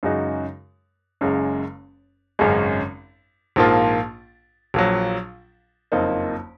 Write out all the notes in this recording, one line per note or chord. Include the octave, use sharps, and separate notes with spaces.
F#2 C#3 G#3 D#4 F#4
F#1 F#2 C#3 G#3
G#1 F#2 C#3 G#3 C#4
A#1 G#2 F3 A#3 F4
A#1 A#2 F#3
F#1 F2 F3 A#3 D#4